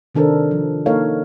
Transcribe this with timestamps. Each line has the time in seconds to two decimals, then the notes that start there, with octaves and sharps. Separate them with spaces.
0.15 C3 D#3 D4 A4 A#4 C5
0.51 F3
0.86 A#3 D#4 A4 A#4 C#5 F5